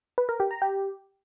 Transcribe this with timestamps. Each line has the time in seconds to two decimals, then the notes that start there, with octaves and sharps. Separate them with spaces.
0.18 B4
0.29 A#4
0.40 G4
0.51 A#5
0.62 G4